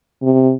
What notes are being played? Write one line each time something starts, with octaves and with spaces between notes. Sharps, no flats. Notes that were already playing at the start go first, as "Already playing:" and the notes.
C3